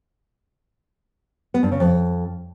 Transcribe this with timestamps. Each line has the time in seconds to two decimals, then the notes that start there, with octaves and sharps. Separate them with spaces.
1.54 B3
1.63 G2
1.72 C#3
1.80 F2